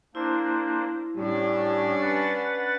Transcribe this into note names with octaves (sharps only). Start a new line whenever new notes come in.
A#3 D4 E4 C5
A2 G3 C#4 D4
B4 F#5 A6